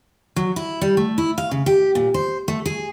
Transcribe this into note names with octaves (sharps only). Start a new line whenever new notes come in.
F#3
E4
G3
A3
E4
F5
C#3
G4
A#2
C5
A3
G#4